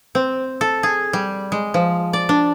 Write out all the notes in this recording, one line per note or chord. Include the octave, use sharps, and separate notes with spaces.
C4
A4
G#4
G3
G#3
F3
D5
D4